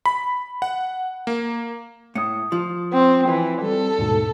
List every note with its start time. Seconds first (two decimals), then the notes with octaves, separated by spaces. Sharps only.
0.06 B5
0.62 F#5
1.27 A#3
2.15 A2 D#6 C#7
2.52 F3
2.92 C4
3.29 E3
3.62 G3 C4 A4
3.98 D#2 G#2 B2